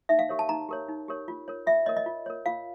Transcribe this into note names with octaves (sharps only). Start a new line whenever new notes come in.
D#4 E5
F5
G4 A#4 C#5
A5
D#4 A#5
G4 A#4 C#5
D#4
G4 A#4 C#5
F4
A#4 C#5
F4 E5
A#4 C#5 D#5
D#5
F4
A#4 C#5
F4 F5